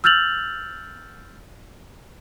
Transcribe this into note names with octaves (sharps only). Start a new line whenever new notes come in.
E6 F6 G6 A6 F7 F#7